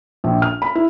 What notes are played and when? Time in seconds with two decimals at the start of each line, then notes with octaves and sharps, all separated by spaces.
0.24 A#1
0.42 F6
0.62 B5
0.75 E4